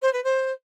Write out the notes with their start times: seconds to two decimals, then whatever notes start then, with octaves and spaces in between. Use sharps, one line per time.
0.02 C5
0.13 B4
0.24 C5